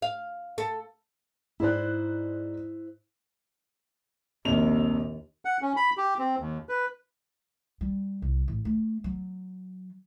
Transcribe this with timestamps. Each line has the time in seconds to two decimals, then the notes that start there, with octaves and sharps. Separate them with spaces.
0.02 F5
0.58 A4
1.60 G#2 E4 C5 D5 F#6
4.45 A#1 D#2 C3 F7
5.45 F#5
5.62 C#4
5.76 B5
5.97 G4
6.19 C4
6.40 D#2
6.69 B4
7.81 G3
8.22 C2
8.48 A1
8.65 A3
9.04 F#3